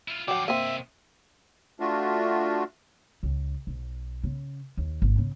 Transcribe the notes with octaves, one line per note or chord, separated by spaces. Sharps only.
E4 F4
D3 F3 F#3 F#5 G5 D6
C3 A#3 C4 D#5 E5
A3 D4 F4 F#4
C#2
B1
C#3
D#2
G#1
C#3